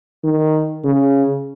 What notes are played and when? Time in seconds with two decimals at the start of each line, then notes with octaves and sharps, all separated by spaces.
0.24 D#3
0.84 C#3